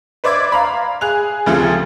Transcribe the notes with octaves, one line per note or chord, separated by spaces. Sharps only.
B4 C5 D5 E5 D6 G#6
F5 A#5 B5
G#4 F#6 F7
D2 C#3 F3 C4 G4 A4